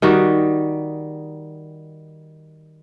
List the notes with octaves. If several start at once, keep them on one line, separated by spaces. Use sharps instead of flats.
D#3 G3 D#4 F#4